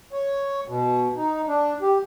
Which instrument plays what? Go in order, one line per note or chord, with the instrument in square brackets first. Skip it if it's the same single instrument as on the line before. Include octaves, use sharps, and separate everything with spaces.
[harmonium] C#5
B2
D#4
D4
G4